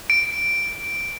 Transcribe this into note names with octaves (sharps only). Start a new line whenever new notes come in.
D7